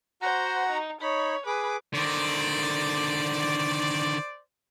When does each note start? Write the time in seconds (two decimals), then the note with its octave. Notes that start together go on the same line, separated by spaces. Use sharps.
0.22 F#4 C5 F#5 A#5
0.69 D#4
1.01 D#4 C#5 B5
1.46 G#4 B4 D6
1.94 D3 D#3 C5 D5